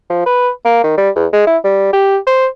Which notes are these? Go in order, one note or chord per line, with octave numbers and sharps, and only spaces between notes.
F3
B4
A#3
D#3
G3
E2
G#3
E4
G3
G4
C5